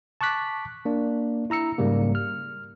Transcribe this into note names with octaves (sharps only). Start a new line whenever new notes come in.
A5 C#6 D6 F#6 B6
A#3 D4
E4 A#5 E6 C#7
G#2 C#3 G3 A#3
F6